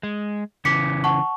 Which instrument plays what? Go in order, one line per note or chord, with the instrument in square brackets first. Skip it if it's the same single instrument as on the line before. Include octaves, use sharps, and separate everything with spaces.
[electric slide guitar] G#3
[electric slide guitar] C#3 E3 [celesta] D6 B6 C#7
[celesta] F#5 A5 C#6